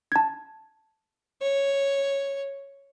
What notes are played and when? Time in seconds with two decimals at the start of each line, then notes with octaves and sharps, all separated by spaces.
0.12 A5 G#6
1.42 C#5